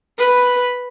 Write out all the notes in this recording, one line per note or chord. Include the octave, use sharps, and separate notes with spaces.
B4